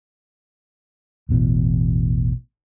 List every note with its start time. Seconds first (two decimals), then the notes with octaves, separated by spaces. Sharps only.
1.29 E1 A1 B2 E3